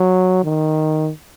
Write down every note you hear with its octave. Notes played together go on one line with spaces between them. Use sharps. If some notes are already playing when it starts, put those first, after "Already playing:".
Already playing: F#3
D#3